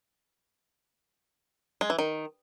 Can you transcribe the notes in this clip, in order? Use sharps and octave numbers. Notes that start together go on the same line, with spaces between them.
G#3
E3
D#3